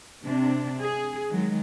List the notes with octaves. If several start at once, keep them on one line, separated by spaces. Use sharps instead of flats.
C3 D4
G#4
D#3 F#3 G#3